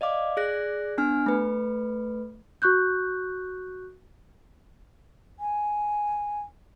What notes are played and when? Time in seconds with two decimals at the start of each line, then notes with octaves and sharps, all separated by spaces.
0.01 D5 D#5 F5 D6
0.37 G#4 D5 F#6 A#6
0.98 B3 D4 G#5 F6
1.26 A3 B4
2.62 F#4 C#6 F#6 G6
5.40 G#5